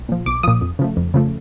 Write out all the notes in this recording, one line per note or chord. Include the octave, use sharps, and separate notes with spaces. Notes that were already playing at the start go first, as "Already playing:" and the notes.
Already playing: B1
A#2 F3
B1 D6
A#2 F3 D#6
F2
C#3 F3 A3
F2
C#3 F3 A3